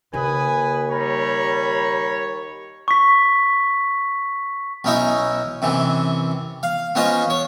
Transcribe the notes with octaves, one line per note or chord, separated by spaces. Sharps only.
D#2 C#3 A#3 B4 G#5 D#6
G3 C#5 A#5 B5
C#6 B6
B1 C#4 D#4 E4 D#5
F#2 C3 E3
F5
B3 C#4 F4 C5 D#5 G#5
C#5